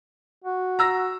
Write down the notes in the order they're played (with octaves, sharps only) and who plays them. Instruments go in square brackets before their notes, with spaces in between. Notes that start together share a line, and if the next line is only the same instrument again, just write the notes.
[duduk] F#4
[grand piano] A#5 E6 A#6